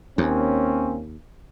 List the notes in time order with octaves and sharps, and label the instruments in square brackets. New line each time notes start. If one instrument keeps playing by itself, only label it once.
[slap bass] D#2 [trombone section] A#3 C4 C#4